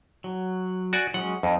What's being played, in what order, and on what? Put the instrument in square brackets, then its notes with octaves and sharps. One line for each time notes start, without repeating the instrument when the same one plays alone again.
[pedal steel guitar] F#3
[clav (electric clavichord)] F#4 D5 G#5
[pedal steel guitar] F#3 G#3 C#4 [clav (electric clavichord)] F#5
[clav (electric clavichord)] F2 [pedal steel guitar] D#4